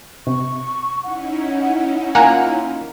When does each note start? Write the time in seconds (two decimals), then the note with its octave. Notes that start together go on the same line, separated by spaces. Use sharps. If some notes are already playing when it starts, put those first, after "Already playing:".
0.27 C3 C#6
1.04 C#4 D#4 E4 F#5
2.15 A#3 F4 F#5 G#5 A#5